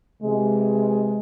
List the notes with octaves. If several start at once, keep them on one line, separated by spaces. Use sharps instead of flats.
C3 E3 G#3